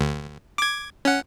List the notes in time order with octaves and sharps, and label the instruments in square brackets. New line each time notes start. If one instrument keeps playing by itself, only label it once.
[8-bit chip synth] D2
D6 G#6
C#4 F#5